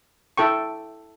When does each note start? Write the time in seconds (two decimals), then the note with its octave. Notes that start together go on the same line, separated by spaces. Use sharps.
0.37 E4 A4 G5 C#6